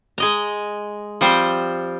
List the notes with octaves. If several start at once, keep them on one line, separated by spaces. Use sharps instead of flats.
G#3 D#5 A#5
F3 G3 C4 C5 G5